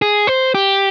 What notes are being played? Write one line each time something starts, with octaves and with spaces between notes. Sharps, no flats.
G#4
C5
G4